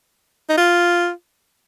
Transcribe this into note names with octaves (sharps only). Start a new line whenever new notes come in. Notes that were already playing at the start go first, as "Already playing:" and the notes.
D#4
F4